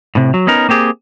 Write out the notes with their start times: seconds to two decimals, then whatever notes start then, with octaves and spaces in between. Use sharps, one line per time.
0.15 A2 C3
0.34 F#3
0.47 B3 C#4 D#4 A#4
0.69 A#3 C4 G4 G#4